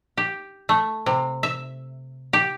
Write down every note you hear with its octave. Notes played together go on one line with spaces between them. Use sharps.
G4
A3
C3
E5
G4